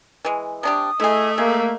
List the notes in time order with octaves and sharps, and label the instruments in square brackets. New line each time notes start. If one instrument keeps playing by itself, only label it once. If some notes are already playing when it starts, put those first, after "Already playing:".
[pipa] E3 G#3
[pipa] C3 D4 G4 [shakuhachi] D#6
[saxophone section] A3 [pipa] E4 G#4 [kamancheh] D#5
[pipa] G#3 [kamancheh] A#3